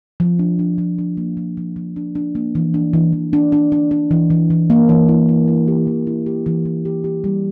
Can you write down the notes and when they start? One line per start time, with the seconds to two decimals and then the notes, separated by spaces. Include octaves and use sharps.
0.20 F3
0.39 D4
0.59 D4
0.78 F3
0.99 D4
1.17 A#3
1.37 F3
1.57 F3
1.76 F3
1.96 D4
2.15 D4
2.35 A#3
2.55 E3
2.74 D4
2.93 E3
3.13 E3
3.33 D4
3.52 D4
3.72 D4
3.91 D4
4.11 E3
4.30 E3
4.50 E3
4.70 A#3
4.89 E3
5.09 E4
5.29 E4
5.48 E4
5.68 G4
5.87 E3
6.07 E4
6.26 G4
6.46 E3
6.65 E3
6.85 G4
7.04 G4
7.24 G3